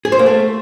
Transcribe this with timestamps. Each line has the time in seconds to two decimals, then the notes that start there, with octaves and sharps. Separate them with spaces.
0.05 G#4
0.12 C5
0.19 A#3
0.26 A3